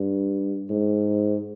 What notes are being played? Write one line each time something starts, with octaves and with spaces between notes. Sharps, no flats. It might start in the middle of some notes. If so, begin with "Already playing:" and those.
Already playing: G2
G#2